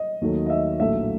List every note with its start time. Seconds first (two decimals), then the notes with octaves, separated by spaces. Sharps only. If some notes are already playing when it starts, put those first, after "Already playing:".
Already playing: D#5
0.21 D#2 D#3 F#3 A3
0.46 D#5
0.50 E5
0.79 A#1 A2 F#3 A3 E5